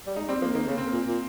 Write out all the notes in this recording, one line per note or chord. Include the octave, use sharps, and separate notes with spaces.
G3
G#3 D#4
G3 C4
F3 A#3
D#3 A#3
C#3 A#3
C4
A#3
A#2
A#2